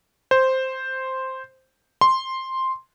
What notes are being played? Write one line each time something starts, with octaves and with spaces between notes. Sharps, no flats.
C5
C6